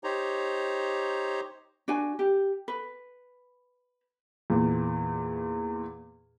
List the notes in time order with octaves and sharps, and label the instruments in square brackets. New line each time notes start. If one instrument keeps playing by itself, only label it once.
[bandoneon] D#4 G4 C5 C#5 A#5
[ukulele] D4 F#4 G#5
G4
B4
[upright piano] E2 A#2